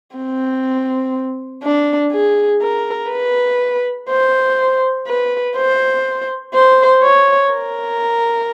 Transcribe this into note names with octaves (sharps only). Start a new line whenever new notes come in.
C4
D4
G#4
A#4
B4
C5
B4
C5
C5
C#5
A#4